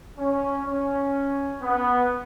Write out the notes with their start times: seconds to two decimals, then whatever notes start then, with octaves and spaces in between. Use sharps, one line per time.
0.18 C#4
0.66 C#4
1.62 B3